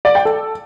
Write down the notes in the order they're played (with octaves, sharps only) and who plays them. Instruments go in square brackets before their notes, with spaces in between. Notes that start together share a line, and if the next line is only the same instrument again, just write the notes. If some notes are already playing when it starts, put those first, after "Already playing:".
[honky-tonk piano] D5
G5
A4